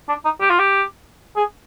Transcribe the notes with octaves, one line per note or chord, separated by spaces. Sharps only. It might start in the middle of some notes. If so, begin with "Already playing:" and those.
D4
D#4
G4
F4
G4
G#4